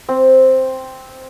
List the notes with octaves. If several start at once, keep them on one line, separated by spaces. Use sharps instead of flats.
C4